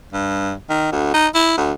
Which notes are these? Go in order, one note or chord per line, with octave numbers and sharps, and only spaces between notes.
G2
D#3
D2
D#4
E4
D2